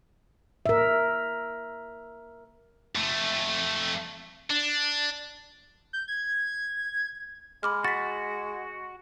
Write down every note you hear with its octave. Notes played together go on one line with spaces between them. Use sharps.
A#4 E5
F2 A3
D4
G6
G#6
G#3 B5 D6 F6
F#4 A6 B6